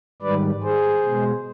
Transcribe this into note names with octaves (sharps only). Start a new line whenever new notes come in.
G#2 D#3 G3 B4 D5
G#4 C5
B2 G#3